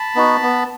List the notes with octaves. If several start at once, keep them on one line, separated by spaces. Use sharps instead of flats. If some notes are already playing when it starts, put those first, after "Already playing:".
Already playing: A5 B5
B3 D#4 F#4
B3